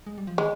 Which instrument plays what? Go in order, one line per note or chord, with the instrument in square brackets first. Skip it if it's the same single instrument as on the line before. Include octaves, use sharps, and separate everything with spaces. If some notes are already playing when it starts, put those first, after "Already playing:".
[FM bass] G#3
G3
F3
[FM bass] D#3 [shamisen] G#3